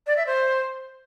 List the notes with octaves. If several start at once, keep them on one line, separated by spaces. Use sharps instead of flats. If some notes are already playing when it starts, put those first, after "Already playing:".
D5
E5
C5